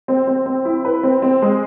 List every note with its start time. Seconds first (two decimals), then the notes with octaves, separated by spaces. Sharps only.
0.08 C4
0.27 C4
0.46 C4
0.65 E4
0.85 B4
1.03 C4
1.22 C4
1.42 G#3